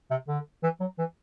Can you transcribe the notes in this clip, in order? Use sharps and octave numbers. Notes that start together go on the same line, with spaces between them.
C3
D3
E3
F#3
E3